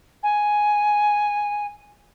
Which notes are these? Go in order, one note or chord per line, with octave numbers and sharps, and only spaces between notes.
G#5